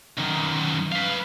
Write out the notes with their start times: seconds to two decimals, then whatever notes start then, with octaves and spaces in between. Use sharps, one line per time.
0.18 F#2 D#3
0.92 B4 F5